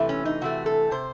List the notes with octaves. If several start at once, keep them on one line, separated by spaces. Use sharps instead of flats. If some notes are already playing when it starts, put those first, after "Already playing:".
Already playing: C3 E3 A3
C#4
D#4
C3 E3 A3 F#4
A4
C3 C5